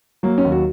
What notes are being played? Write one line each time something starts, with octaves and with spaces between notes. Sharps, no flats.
F#3 A#3
C#4
D#2
F#4